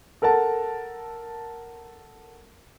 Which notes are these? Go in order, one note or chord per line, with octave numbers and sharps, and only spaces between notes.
A4 A#4 F#5 A5